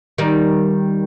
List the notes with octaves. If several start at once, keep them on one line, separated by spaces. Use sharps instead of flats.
D#3 G3